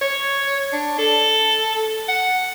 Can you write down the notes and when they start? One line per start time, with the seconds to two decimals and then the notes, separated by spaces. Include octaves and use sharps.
0.01 C#5
0.73 D4
0.98 A4
2.08 F#5